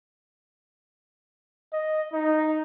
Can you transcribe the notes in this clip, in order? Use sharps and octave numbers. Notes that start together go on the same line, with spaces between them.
D#5
D#4